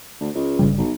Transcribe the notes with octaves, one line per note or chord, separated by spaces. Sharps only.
D2
C#2
G1 C#3 G3
B1